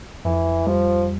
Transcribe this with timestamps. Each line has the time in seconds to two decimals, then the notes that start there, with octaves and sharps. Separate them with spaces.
0.25 F2 E3
0.67 F3 G3